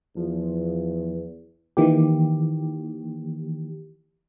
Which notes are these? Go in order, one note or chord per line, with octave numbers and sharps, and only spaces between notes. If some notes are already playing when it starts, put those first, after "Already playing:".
E2 F3
D#3 E3 A#3 G4